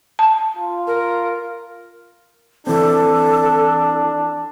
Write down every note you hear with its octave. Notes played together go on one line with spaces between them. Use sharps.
A5
F4
A#4
E3 C4 D4 A4